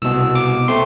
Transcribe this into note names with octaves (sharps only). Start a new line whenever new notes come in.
C2 B2 B3 E6
D6
A3 C4 C6